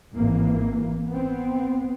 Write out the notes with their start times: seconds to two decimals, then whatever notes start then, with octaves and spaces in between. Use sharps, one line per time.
0.15 G#1 E3 A#3
1.09 B3 C4